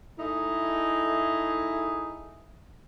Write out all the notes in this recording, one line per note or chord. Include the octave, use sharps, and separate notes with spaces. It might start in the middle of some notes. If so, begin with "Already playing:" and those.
A3 D#4 E4 G#4